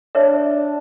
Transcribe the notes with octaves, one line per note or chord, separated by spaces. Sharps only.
D4 C#5 E5